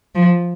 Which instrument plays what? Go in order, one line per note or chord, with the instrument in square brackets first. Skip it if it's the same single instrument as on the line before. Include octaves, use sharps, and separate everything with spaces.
[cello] F3